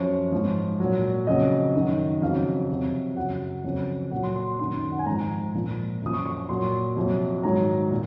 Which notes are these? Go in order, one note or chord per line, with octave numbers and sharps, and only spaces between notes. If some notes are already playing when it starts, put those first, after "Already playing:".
Already playing: F#2 F3 C#5
G#2 F3
A#2 F#3
F2 C#3 F#3 D#5
F#2 D#3 F#3
F2 C#3 F#3 F5
F2 C3 F#3
F#2 C#3 F#3 F#5
F2 C#3 F#3
A#2 F#3 F#5
C6
C6
F#2 D#3 F#3 C6
F#5
G#5
G#2 F3 A#5
A#2 F3
F#2 F3 D#6
C#6
C#6
C#6
A#2 F#3 C6
F2 C3 F#3
G#2 D#3 F#3 A#5
A#2